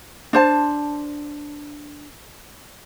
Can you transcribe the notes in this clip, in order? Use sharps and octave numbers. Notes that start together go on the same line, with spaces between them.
D4 C5 A5